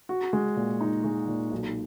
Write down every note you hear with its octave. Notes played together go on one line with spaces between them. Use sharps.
F#4
G#3
A#2
D#4
G#3
A#2
B1